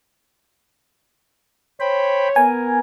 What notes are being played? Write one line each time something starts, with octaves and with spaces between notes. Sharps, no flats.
C5 C#5 G5 B5
B3 A#4 G#5